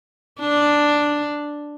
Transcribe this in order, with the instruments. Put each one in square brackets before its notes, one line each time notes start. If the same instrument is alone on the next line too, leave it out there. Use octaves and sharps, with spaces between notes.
[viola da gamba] D4